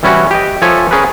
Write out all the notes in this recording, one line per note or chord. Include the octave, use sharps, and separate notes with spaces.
E3 G3 C#4 E4 F#4
G4 D#5
F3 A4 C#5 E5 G#5 A5
C#4 G#4 A#4 B4